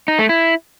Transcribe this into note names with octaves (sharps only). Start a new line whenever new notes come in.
D#4
A3
E4